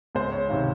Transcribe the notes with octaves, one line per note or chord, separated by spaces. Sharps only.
C#2 C5
C#5
C3 D#3 F5